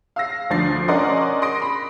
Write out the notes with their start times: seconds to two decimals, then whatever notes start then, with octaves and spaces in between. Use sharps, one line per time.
0.16 F5 E6 A#6 C7
0.50 D2 F3 D4 A6 C7
0.88 C#4 A#4 D5 D#5 F#5 C6
1.42 C6 D6 D#6 A#6 D7
1.62 B5